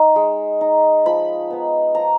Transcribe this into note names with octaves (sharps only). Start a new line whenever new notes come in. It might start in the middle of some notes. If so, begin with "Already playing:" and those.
Already playing: D#4
G#3
D#4
F3 B5
B3 D#4
F3 A#5